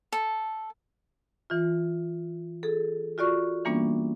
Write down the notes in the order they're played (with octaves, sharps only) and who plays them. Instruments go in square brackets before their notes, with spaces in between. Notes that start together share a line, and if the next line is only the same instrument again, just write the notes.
[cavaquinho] A4
[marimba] E3 F4
G#4 A4
F4 F#4 D5 C#6
E3 G3 A#3 B3 C#4 D4